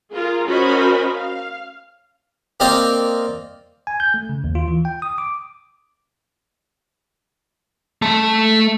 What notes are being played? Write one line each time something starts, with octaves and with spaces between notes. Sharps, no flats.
F4 G#4 A#4
C#4 F#4 A#4 C5 D#5 B5
F5
A#3 C4 D5 D#5 F5 G5
G#5
G6
A3
C#3
D#2
F4
E3
G5
D#6
D6
A3 A5